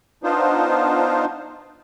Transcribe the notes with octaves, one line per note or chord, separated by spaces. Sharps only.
B3 D4 D#4 F4 C5